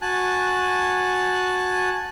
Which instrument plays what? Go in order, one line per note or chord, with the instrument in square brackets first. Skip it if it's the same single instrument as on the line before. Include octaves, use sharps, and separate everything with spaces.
[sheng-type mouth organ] F#4 G#5 A5 F#6